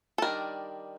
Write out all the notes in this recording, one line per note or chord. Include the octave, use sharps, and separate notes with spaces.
A4
D#3 G3 D4 A#4